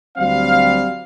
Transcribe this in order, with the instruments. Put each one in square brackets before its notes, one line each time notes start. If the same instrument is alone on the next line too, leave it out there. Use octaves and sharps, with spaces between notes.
[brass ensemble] D2 F#3 G3 C4 F#4 F5